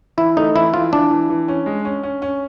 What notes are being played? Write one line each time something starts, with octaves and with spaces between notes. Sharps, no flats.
E3 E4
A3 D#4
E3 E4
E3 F4
E3 D4
E3
E3
C#4
G#3
C#4
C#4
C#4